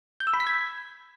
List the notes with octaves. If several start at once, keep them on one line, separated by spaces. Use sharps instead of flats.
G6
E6
B5
B6
G#6